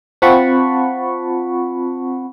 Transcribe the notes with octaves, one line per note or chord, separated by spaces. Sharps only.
C4 F4 F#5 A5 B5 C#6